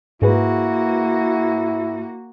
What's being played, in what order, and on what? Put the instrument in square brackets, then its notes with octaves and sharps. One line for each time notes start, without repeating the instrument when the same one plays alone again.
[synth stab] G#2 G#4 B4 [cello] A#3 F#4 [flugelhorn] E4